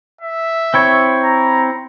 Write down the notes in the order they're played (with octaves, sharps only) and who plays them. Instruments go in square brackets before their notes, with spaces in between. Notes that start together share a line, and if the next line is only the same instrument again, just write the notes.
[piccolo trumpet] E5
[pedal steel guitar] C4 E4 C#5
[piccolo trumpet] A#5